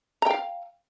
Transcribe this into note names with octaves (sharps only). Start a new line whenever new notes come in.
F5 G5 A#5